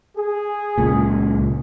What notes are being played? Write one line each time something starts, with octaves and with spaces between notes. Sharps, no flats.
G#4
C#2 A#2